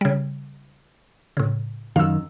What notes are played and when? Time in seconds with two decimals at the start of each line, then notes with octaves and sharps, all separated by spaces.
0.01 C#3 G3
1.37 A2 C#3
1.96 F#2 D#3 F5 E6